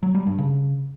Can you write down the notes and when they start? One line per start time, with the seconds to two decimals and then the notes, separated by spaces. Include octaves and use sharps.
0.03 F#3
0.15 G3
0.27 G2
0.38 C#3